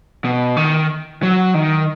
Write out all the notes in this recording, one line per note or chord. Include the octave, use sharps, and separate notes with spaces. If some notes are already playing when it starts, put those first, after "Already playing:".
B2
D#3
F#3
D#3